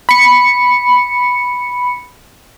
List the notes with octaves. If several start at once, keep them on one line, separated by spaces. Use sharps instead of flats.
B5 C#7